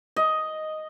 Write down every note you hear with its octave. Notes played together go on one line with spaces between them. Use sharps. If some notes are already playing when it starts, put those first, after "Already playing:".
D#5